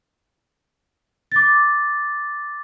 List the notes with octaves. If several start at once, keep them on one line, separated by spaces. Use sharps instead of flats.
D6 A6